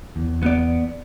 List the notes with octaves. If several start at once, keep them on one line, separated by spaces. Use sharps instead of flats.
E2
B3 D5